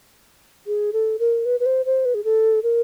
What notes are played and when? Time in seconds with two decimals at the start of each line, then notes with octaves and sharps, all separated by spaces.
0.67 G#4
0.93 A4
1.19 A#4
1.45 B4
1.60 B4
1.66 C5
1.85 C5
2.05 B4
2.14 G#4
2.24 A4
2.63 A#4